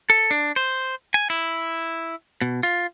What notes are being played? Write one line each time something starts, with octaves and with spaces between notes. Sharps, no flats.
A4
D4
C5
G#5
E4
B2
F4